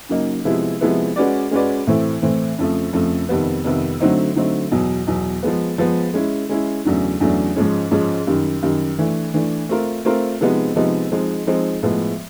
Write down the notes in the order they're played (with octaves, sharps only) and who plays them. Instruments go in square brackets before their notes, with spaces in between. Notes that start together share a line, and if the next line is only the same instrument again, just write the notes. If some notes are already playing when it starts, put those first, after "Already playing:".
[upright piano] C#3 F#3 A#3 D#4
C3 F3 G#3 B3 E4
C3 F3 G#3 B3 E4
G#3 C#4 F#4 B4 D5
G#3 C#4 F#4 B4 D5
A2 E3 A3 C4
A2 E3 A3 C4
F2 C#3 F3 A3
F2 C#3 F3 A3
F2 C3 D#3 G3 B3
F2 C3 D#3 G3 B3
D3 F#3 A3 C4 D#4
D3 F#3 A3 C4 D#4
E2 B2 F#3
E2 B2 F#3
F3 G#3 B3
F3 G#3 B3
G#3 C#4 E4
G#3 C#4 E4
E2 C#3 F#3 A3 D4
E2 C#3 F#3 A3 D4
G#2 F3 G#3 C#4
G#2 F3 G#3 C#4
F#2 D#3 G3
F#2 D#3 G3
E3 A3 D4
E3 A3 D4
A3 C4 F4 A#4
A3 C4 F4 A#4
C3 F3 G#3 B3 D#4
C3 F3 G#3 B3 D#4
F3 G#3 C4 D#4
F3 G#3 C4 D#4
A2 F3 G#3 B3